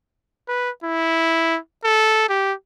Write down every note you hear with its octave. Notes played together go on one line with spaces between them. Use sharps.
B4
E4
A4
G4